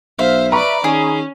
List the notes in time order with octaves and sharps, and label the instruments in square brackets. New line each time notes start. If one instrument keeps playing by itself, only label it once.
[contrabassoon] B1 [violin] C5 [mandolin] E5 F5
[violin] B4 D5 [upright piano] A#5 B5 C#6
[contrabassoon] D#3 [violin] C#4 [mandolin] G#4